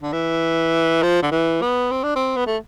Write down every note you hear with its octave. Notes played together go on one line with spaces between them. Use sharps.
D3
E3
F3
D3
E3
B3
C4
D4
C4
B3
A3